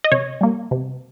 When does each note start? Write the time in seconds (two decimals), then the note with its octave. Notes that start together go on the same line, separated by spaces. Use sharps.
0.04 D#5
0.12 C3 C#5
0.41 G3 A#3
0.71 C3